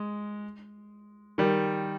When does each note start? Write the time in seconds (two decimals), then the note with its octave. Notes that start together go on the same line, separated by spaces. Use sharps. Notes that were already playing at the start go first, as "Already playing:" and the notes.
Already playing: G#3
1.38 D#3 G3